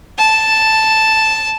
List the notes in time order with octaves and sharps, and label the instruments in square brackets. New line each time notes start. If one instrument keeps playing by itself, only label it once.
[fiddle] A5